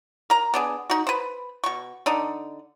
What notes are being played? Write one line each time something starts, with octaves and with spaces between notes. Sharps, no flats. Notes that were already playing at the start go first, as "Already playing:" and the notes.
A#4 A#5
B3 D4 G#4
D#4 F#4
B4 C5
B2 C#6
D3 D4 D#4